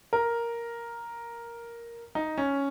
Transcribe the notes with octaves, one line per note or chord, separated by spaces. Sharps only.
A#4
D#4
C#4